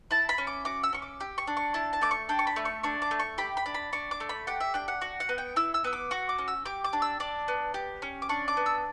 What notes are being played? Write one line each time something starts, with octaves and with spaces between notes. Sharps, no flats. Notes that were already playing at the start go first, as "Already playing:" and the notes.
E4 A5
B5
C#4
D6
F#4 D6
E6
C#4 C#6
D6
G4
C#6
D4
C#6
E4 A5
A5
A3 D6
C#6
D4 G5
C#6
B5
A3
C#6
D4 C#6
D6
A3
C#6
G4 B5
B5
D4
B5
D4 C#6
D6
A3
B5
G4 F#5
E5
D4 G5
F#5
F#4
F#5
B3
G5
E4 E6
E6
B3 E6
D6
F#4 C#6
D6
C#4
E6
G4 D6
D6
D4
E6
D4 D6
B3
G4
C#4
D6
D4 C#6
D6
B3
E6